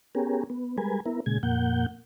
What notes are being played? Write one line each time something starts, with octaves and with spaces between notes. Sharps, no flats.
B3 C#4 G4 G#4 A#4
B3
G3 G#3 A#4 B4 G#5
B3 E4 A#4
A#2 C#3 G#3 G#6
F2 A#2 A#3 F#5 G6